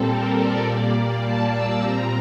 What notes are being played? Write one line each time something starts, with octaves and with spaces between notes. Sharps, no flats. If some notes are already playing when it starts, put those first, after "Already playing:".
Already playing: A#2 G3 C4 A4
A#4
D5
A#2 G3 A#3 D5
A5
E6
A#2 G3 C4 A#5